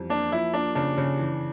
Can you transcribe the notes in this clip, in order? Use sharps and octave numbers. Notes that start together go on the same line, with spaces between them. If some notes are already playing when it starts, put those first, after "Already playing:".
Already playing: F2 E3 G3
A#3 D4
F3 E4
A#3 D4
C#3 D4
C#3
E3